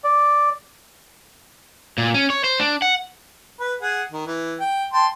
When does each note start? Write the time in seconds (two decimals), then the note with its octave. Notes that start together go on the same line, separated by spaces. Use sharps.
0.04 D5
1.98 A#2
2.14 C#4
2.30 C#5
2.44 C5
2.60 D4
2.82 F#5
3.60 B4
3.81 G#4 F#5
4.12 D#3
4.26 E3
4.60 G5
4.93 G5 A5 C6